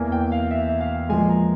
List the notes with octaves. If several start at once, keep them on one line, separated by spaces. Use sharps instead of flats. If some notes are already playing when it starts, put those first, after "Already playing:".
Already playing: E2 E3 A#3 G#5
G5
F5
E5
E5
F5
A#2 F3 G#3 G#5
A#5